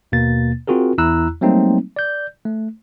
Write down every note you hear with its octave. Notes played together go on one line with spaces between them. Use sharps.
D#2 B2 A#3 A6
C4 F4 F#4 G#4 A#4
E2 E4 A#5 E6 F#6
F#3 G3 A3 A#3 C4 D#4
D5 G6
A3